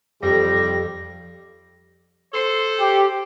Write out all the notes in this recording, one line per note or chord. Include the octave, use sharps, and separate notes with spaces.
F2 C3 F3 G3 G4 A#6
A4 C5
G4